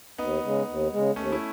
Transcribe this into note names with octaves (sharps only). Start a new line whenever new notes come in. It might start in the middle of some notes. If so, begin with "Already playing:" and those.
D#2 B3 D#4
C#3 G#3
D#2
C#3 G#3
D#2 A3 C#4
E4